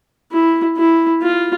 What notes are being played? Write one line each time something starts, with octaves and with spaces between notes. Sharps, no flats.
E4
E4
F4